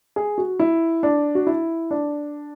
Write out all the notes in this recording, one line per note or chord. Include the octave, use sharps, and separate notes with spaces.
G#4
F#4
E4
D4
F#4
E4
D4